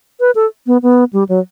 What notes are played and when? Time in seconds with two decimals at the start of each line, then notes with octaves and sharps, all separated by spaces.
0.20 B4
0.35 A4
0.67 B3
0.82 B3
1.13 G3
1.29 F#3